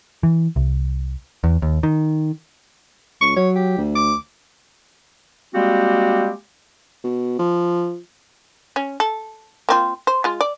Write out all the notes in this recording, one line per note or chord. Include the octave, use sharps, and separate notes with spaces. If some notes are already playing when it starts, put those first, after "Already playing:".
E3
C2
E2
D#2
D#3
C#2 C#6
F#3 C#5
G4
D2
D6
G3 G#3 A#3 C4 F#4 G4
B2
F3
C#4
A4
A#3 C4 F4
C5
G#3 F4
D5